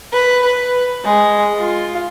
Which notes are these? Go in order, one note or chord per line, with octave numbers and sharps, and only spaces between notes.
B4
B4
G#3
F4